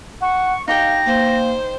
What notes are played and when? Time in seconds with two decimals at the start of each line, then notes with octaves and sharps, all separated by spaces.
0.22 F#5 C#6
0.68 D#4 G4 F5 G5 A#6
1.06 A#3 C5